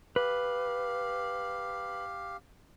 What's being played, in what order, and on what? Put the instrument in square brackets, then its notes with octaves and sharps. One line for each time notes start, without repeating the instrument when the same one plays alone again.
[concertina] G4 F5 [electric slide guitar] B4